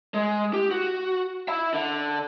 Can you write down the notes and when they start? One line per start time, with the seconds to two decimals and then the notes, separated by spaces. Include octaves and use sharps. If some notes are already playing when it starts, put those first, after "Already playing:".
0.14 G#3
0.53 G4
0.71 F#4
1.48 E5 B5
1.74 D3